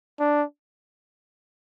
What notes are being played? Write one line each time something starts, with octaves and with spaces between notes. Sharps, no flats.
D4